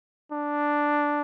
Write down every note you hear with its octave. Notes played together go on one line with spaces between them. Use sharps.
D4